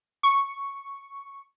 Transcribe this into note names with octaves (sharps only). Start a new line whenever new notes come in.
C#6